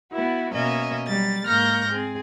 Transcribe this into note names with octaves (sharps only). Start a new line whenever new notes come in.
B3 E4 F#4
B2 A#3 C#4 D#5 E5
F#3 G3 A6
G#2 A#3 C#6 F6 G6 A#6
C4 G#4